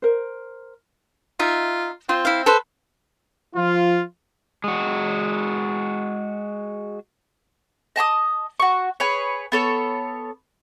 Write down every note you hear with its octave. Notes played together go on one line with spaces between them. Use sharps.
A#4 C5
D#4 F4 E5
C4 F4
E4 F5
A4 B4 C5
F3 F4
G#3 F#4
D#5 A5 B5 D#6
F#4 C#6
G#4 B4 C#5
B3 A4 C#5